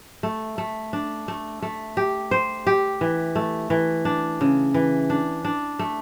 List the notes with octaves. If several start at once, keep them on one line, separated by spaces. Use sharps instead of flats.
A3
A3
D4
A3
A3
G4
C5
G4
E3
A3
E3
D4
C#3
E3
D4
D4
A3